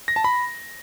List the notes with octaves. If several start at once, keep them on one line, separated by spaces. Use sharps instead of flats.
A#6
A5
B5